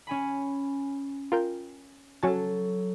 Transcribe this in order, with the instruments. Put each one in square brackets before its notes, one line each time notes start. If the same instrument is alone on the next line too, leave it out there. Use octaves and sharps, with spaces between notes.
[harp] C#4 G#5 B5
[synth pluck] F4 A#4 G5
[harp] F#3 A4 [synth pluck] C#4 F#4 A5